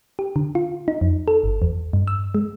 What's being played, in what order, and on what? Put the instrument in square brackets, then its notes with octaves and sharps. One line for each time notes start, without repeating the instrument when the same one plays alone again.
[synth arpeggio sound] G4
D3
F4
D#4
F2
A4
G1
E2
G2
E6
G#3